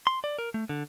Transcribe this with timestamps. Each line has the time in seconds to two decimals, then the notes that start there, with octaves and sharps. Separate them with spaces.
0.07 C6
0.24 D5
0.39 A#4
0.54 A3
0.69 D3